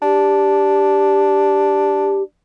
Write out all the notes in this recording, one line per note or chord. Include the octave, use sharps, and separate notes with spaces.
D4 G4